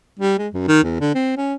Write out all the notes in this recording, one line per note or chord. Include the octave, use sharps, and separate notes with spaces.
G3
G#3
F#2
D#3
E2
D3
C4
C#4